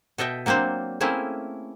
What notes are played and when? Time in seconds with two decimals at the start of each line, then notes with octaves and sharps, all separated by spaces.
0.18 B2 A4 D#5 E5 G5
0.46 F#3 A#3 C4 D4 C5
1.01 A3 A#3 C4 C#4 E4 G#4